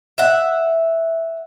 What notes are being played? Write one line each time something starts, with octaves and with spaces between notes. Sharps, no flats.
E5 F#5